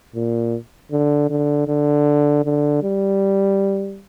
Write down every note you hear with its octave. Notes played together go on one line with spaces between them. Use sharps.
A#2
D3
D3
D3
D3
G3